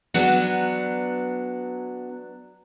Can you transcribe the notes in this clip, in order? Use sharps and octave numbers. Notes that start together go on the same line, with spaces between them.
F#3 B3 D4